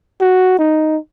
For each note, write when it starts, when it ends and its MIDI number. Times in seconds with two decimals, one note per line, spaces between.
0.21 0.58 66
0.59 0.97 63